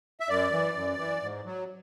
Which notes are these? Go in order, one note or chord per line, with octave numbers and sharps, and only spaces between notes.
E5
F#2 D5
E3
F#2
E3
G#2
F#3